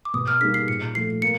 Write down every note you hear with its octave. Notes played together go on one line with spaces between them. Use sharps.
D6
B2 D#6
F6
G3 A#3 D#4 G#4 B6
C7
A#2 C#7
F3 A3 C7
A#3 C#7